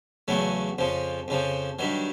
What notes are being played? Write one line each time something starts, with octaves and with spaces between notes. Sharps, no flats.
E2 C#3 F#3 A3
F2 C#3 F3
F2 C#3 F3
G2 D#3 F#3